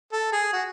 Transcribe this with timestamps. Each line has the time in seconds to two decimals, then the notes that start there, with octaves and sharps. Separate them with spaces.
0.13 A4
0.32 G#4
0.53 F#4